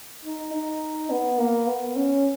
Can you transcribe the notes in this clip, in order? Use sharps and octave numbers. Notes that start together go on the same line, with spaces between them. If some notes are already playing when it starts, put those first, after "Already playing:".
D#4
D#4
B3
A#3
B3
C#4